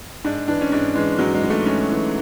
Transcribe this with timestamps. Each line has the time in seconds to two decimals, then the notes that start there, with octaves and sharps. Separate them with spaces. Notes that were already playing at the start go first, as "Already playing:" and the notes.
0.24 G#2 D4
0.48 E3 D4
0.61 C#4
0.72 G#2 D4
0.95 E3 G#3
1.19 G#2 F#3
1.34 G#3
1.43 E3
1.50 A3
1.66 G#2 C#4
1.90 E3